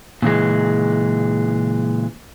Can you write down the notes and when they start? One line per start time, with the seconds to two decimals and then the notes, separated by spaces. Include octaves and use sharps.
0.22 A#2 C#3 E3 G#3